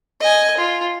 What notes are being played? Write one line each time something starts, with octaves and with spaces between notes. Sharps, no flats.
D#5 G#5
F4